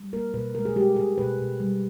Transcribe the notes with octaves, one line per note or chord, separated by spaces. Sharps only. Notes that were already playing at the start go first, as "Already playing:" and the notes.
Already playing: G3
A#3 A#4
B2 B4
G#3 A#4
G#4
G#3 G4
B2 G#4
B2 B4
B2
G3